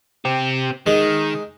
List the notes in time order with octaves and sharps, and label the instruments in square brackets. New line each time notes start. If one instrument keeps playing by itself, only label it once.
[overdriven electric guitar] C4 G4
[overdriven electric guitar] D#3 [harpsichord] G#3